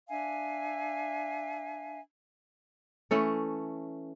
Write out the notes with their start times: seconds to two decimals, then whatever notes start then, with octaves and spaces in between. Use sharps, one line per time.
0.09 D4 E5 F5 G#5
3.11 E3 A3 C#4 A4